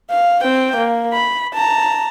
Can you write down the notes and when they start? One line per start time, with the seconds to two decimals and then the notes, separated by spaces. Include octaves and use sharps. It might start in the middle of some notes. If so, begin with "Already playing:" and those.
0.10 F5
0.43 C4 G5
0.76 A#3
1.13 B5
1.54 A5 A#5